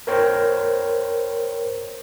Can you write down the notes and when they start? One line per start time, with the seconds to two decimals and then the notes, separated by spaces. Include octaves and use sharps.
0.07 A#4 C5 C#5 G5